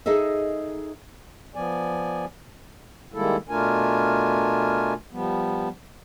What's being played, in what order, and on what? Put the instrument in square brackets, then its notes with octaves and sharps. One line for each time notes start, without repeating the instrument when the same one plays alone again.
[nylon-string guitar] D#4 G#4 A4 D#5 E5
[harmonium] F3 B3 D5 G#5
D#3 G3 G#3 A#3 E4 A4
B2 A3 D4 F4 A#4 G#5
F3 G3 B3